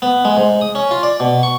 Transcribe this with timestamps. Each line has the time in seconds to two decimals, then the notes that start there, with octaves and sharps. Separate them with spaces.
0.02 B3
0.25 G#3
0.37 G#2
0.61 D#6
0.75 C#4
0.91 F4
1.03 D5
1.20 B2
1.43 C#6